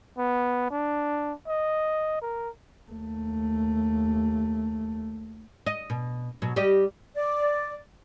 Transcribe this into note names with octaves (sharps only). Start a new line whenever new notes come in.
B3
D4
D#5
A#4
D#2 A3
D#5
B2
B2 F#3
G3 G4 D#5
D5